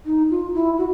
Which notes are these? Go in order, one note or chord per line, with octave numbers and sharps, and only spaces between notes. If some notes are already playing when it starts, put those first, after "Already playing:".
D#4
F4
E4
F#4